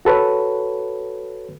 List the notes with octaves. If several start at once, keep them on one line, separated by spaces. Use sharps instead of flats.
F#4 A4 B4 C#5